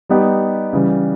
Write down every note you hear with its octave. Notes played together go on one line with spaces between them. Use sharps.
G3 B3 D#4 G4
C#3 E3 G3